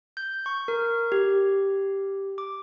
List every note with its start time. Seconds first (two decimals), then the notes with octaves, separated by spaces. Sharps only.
0.17 G6
0.46 C#6
0.68 A#4
1.12 G4
2.38 D6